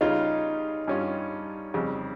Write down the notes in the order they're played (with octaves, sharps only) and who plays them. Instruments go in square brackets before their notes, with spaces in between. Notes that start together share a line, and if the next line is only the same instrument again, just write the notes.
[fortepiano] C#3 G3 C#4 F4 [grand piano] D#4
[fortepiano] G2 G3 C#4 F4
F2 C#3 G3